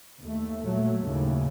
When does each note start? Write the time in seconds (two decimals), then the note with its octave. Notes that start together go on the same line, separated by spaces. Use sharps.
0.21 D#2 A3
0.65 A#2 F#3 A3
1.01 D#2 A2 C#3